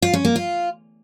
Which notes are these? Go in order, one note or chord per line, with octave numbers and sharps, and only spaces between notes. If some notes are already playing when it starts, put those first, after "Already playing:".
F4
C#4
A#3
F4